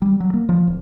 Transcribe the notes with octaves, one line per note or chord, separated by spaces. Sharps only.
G3
F#3
A#3
F3
D1